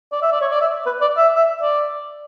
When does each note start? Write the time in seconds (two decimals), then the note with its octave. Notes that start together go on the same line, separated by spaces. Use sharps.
0.12 D5
0.22 E5
0.32 D5
0.41 C#5
0.51 D5
0.61 E5
0.86 B4
1.01 D5
1.17 E5
1.36 E5
1.62 D5